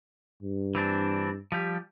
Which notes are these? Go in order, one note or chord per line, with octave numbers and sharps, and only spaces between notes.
G2
E3 C4 D4
F3 G3 G4